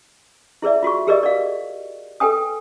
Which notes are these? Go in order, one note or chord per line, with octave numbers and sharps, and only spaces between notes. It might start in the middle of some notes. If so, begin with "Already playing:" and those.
E4 G#4 B4 D5 E5
F4 F#4 G#4 C#6
G4 G#4 A#4 B4 D5 D#5
D5 F5
A4 B4 G5 G#5 D#6